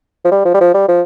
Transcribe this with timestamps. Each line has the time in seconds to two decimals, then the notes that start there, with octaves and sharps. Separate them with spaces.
0.25 F3
0.32 G3
0.45 F3
0.54 G3
0.61 F3
0.74 G3
0.88 F3